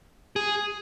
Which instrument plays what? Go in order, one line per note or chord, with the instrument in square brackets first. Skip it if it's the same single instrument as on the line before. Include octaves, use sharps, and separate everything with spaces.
[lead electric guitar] G#4